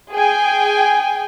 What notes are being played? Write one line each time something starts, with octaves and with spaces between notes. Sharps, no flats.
G#4 G5 G#5